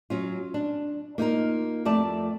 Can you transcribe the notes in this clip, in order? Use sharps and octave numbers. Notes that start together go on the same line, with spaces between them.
F#3 C#4 F4
D4
A#3 D#4 F4 A#4
F2 A3 D5 A5